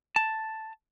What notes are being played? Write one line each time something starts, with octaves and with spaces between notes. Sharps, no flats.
A5